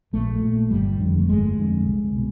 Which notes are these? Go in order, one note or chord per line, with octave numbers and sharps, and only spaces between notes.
A#1 A3
A#2
G1 G3
F2 D3
A3
G1 G#3
F2 D3
C2
B2